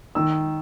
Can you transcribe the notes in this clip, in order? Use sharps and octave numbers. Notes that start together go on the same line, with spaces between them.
D#3 E6